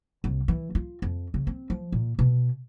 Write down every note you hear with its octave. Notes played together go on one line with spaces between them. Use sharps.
C2
E3
F4
F2
C#3
C4
F3
A#2
B2